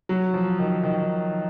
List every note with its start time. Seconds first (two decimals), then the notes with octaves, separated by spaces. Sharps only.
0.09 F#3
0.34 F3
0.59 D#3
0.83 D#3